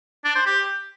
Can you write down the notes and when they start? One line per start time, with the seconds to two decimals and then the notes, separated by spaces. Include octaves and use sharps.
0.25 D4
0.35 C5
0.46 G4